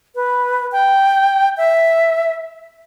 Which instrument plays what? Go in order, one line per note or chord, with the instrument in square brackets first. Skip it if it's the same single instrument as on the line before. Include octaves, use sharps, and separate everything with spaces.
[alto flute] B4
G5
E5